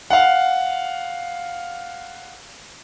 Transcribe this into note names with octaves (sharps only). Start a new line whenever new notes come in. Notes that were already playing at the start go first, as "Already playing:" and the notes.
F5 F#5